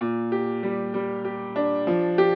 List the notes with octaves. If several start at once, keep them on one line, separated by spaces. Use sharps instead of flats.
A#2
G4
G3
G3
G4
D4
F3
G4